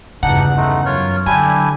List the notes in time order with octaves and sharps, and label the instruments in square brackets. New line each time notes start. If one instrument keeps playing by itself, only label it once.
[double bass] G1 E2 [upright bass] C#3 [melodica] D4 D#4 [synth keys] F#5
[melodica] G#3 A3 D#4
[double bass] F#2 [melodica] F4 A#4 C#5
[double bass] D3 [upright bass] F#3 [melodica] D4 E4 G4 [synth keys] G#5